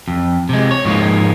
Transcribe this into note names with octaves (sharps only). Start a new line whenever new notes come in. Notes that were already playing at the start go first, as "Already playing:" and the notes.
F2
C3 G#3
C#5
G#2 F3 G#3 A#3